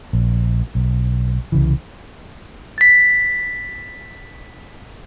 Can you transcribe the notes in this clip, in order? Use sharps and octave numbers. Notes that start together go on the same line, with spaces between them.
A#1
B1
C2 C#3 E3
A6 B6